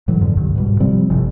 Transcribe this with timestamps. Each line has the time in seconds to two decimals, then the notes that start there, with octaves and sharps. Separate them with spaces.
0.08 A2 E3 F#3
0.21 F2 G#2 B2 D3
0.37 C2 G2 D3
0.55 G#2 B2 G3
0.80 C3 F3 G3 C4
1.10 G1 A2 C3